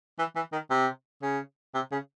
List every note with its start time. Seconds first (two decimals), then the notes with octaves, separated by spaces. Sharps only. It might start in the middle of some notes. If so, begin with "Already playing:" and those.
0.18 E3
0.36 E3
0.53 D#3
0.70 C3
1.22 C#3
1.74 C3
1.92 C#3